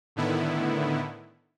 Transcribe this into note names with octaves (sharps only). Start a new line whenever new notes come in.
A2 D3 D#3 B3 E4